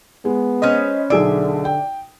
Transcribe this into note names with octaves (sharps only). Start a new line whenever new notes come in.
G#3 B3
C#4 B4 C5 D#5
B1 D3 G#4 D5 E5 D7
G5